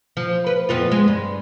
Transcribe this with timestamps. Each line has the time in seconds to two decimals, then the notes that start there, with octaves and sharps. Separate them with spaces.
0.17 F3
0.46 B4
0.69 F2 B3 F4
0.92 G#3
1.08 G2